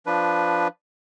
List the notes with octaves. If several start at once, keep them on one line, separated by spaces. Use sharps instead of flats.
F3 D4 B4